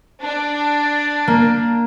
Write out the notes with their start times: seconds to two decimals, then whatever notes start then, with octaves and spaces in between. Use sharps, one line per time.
0.21 D4
1.28 A#3